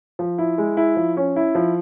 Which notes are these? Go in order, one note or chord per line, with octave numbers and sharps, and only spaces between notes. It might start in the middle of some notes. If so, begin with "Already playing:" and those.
F3
E4
G#3
E4
F3
C#4
E4
F3